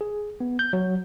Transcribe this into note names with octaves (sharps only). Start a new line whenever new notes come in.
G#4
B3
G6
F#3